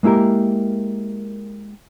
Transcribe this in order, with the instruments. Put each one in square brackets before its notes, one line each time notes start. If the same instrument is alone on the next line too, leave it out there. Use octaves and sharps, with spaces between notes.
[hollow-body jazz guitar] G#3 A#3 E4 G4 A#4